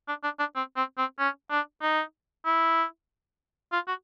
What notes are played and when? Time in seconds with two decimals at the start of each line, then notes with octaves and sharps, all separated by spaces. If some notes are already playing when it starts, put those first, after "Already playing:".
0.08 D4
0.24 D4
0.39 D4
0.56 C4
0.76 C4
0.98 C4
1.19 C#4
1.50 D4
1.82 D#4
2.46 E4
3.72 F4
3.88 F#4